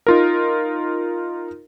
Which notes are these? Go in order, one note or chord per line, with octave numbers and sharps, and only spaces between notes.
D#4 F4 A#4